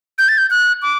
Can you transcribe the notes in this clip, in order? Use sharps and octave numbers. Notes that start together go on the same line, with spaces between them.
G6
A6
G6
F#6
D6